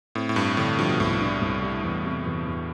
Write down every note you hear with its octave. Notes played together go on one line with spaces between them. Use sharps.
A2 C4
A2
G2 C4
A2 D3
G2 F3
B2
C2 A2
D4
C2
G3
E2
C3
E2
E2